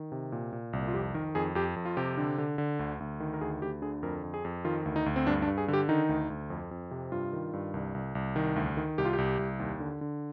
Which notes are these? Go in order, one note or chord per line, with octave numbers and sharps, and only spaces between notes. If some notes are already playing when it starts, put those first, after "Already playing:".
Already playing: D#3
C3
A#2
A#2
C2
F4
F2 G4
D#3 A#4
F2 G#4
F2 G4
F2
F4
C3 G4
D3
D3
D3
D2
D2
D#3
A#4
D2 G#4
D2 G4
D3 G#4
F2 A#4
F2
G#4
F2
D#3 F4
D2
D#4
D2
C4
G2 D4
D4
G2
G#4
D3
G4
D#3 D#4
D2
D2
F2
F2
C3
G2 F4
D#3
G2
C2
C2
C2
D#3
D2
D#3
C2 G4
F4
G4
C2
C2
D#2
D3
D3